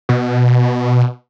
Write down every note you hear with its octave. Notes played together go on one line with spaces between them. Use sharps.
B2